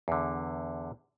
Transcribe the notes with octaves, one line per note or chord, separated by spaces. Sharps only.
E2 D3